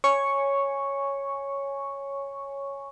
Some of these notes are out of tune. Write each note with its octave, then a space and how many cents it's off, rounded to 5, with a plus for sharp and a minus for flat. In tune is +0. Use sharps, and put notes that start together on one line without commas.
C#5 +0 G#5 +0 C#6 +0